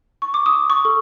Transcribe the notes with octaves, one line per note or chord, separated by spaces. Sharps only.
C#6
D6
D#6
C#6
A4